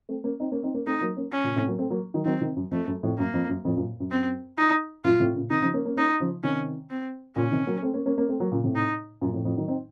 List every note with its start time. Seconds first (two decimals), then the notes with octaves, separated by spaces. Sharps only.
0.09 A3 C4
0.24 A#3 C#4
0.40 C4 D#4
0.52 A#3 C#4
0.63 C4 D#4
0.74 A#3 C#4
0.87 A3 C4 D#4
1.01 F#3 A#3
1.17 A#3 C#4
1.32 C#4
1.44 A#2 C#3
1.56 A2 C3
1.67 F#3 A#3
1.79 A3 C4
1.90 F#3 A#3
2.14 D#3 F#3
2.25 D#3 F#3 C4
2.41 C3 D#3
2.56 F#2
2.71 F2 A3
2.88 F#2
3.03 F2 A2
3.18 F#2 A#3
3.34 F2
3.49 F#2
3.65 F2 A2
3.76 F#2 A#2
4.00 F#2
4.11 C4
4.57 D#4
5.04 F#2 A#2 F4
5.20 A2 C3
5.35 A#2 C#3
5.50 C3 D#3 D#4
5.62 C#3 F3
5.74 A#3 C#4
5.85 A#3 C#4
5.96 A#3 C#4 D#4
6.20 C#3 F3
6.43 C3 D#3 C#4
6.90 C4
7.36 A#2 C#3 C#4
7.52 C3 D#3
7.67 F#3 A#3
7.82 A3 C4
7.94 A#3 C#4
8.06 A#3 C#4
8.18 A#3 C#4
8.29 A3 C4
8.40 F#3 A#3
8.52 A#2 C#3
8.64 A2 C3
8.76 D#4
9.21 F#2 A#2
9.33 F2 A2
9.45 F2 A2
9.57 D#3 F#3
9.68 C4 D#4